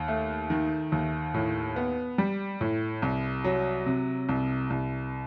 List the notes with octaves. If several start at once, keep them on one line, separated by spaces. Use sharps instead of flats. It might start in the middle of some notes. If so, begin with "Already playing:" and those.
Already playing: D#2
A3
D#3
D#2
A2
B3
G3
A2
C2
F#3
C3
C2
C2